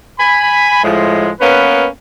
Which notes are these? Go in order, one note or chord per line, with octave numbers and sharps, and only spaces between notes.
G#5 B5
A2 F3 G#3
A#3 B3 C#4 B4